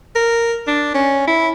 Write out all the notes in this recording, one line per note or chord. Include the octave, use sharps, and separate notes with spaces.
A#4
D4
C#4
E4